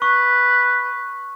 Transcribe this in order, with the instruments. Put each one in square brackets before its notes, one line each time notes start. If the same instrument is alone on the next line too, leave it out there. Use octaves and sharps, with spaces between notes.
[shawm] B4 [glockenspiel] C#6